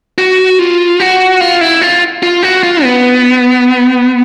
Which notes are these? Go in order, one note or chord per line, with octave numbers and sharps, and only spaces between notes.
F#4
F4
F#4
F4
E4
F4
F4
F#4
F4
B3